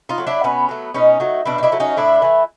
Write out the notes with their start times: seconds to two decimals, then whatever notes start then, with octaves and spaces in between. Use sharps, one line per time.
0.09 D#4 F4
0.18 F#3 A3
0.27 D4 E4
0.43 B2 B3 C#4
0.69 F#3 A3
0.94 B2 C#4 D#4
1.20 F#3 A3
1.45 B2 D4 E4
1.58 D#4
1.63 D4 E4
1.72 F#3 A3
1.80 C#4 D#4
1.97 A2 D4 E4
2.22 E3 A3